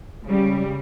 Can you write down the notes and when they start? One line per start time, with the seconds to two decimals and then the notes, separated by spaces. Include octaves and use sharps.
0.24 C#3 G3